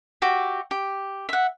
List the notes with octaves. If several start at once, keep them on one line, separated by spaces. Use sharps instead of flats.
F#4 G4 E5
G4
E5 F#5